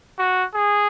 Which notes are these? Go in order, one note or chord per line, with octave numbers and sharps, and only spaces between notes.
F#4
G#4